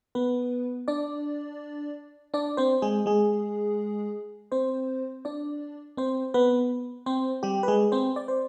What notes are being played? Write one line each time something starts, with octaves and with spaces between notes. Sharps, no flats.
B3 B4
D4 D5
D4 D5
C4 C5
G#3 G#4
G#3 G#4
C4 C5
D4 D5
C4 C5
B3 B4
C4 C5
G3 G4
B4
G#3 G#4
C4 C5
D5
C5